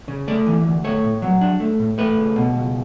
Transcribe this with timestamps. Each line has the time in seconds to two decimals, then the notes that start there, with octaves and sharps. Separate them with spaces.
0.08 C#3
0.28 A3 D5
0.47 E3
0.65 D2
0.84 A3 C#5
1.04 A2
1.22 F#3
1.41 D4
1.60 A3
1.79 A2
1.98 A3 B4
2.18 C#2
2.36 B2
2.56 C#2